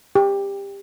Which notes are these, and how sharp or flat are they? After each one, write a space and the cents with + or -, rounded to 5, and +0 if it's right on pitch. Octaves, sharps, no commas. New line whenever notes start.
G4 +20